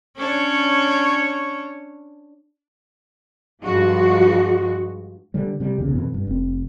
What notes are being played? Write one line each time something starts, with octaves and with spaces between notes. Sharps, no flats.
C#4 D4 C#5
G2 F3 G#3 F#4
D3 G3
C3 G3
B1 E2 C#3 B3
F2 B2 E3 C4
G2
F1 C4